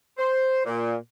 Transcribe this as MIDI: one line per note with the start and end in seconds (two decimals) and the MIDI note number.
0.18 0.61 72
0.65 0.94 46